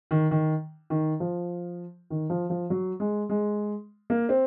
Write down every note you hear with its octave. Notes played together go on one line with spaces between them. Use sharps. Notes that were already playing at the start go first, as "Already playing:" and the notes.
D#3
D#3
D#3
F3
D#3
F3
F3
F#3
G#3
G#3
A#3
C4